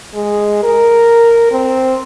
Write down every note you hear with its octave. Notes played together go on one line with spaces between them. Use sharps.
G#3
A#4
C4